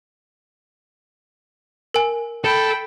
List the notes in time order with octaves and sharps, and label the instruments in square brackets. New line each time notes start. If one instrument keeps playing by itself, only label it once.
[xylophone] A#4 G#5
[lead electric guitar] A4 [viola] G5 B5